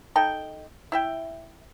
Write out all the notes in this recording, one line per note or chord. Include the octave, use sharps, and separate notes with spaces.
D#4 A4 G5
E4 E5 G5